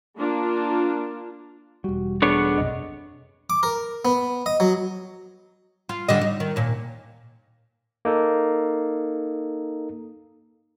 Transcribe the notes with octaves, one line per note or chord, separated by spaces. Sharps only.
A#3 D4 F4
E1 G3 F#4
B3 D4 G#4 A4 C#5 D5
B1 F#2 C3 D#5
D6
A#4
B3
D#5
F#3
F4
D3 G3 D#5
D#4
D#3
D#2 A#2
A#3 D#4 A4